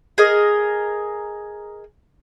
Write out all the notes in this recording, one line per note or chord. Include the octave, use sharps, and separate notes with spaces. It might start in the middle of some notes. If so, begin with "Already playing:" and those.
G#4 A#4 D#5